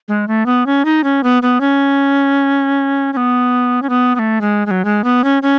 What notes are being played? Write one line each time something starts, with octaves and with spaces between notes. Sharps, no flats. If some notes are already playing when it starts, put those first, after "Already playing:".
G#3
A3
B3
C#4
D#4
C#4
B3
B3
C#4
C#4
B3
C#4
B3
B3
A3
G#3
G#3
F#3
G#3
B3
C#4
C#4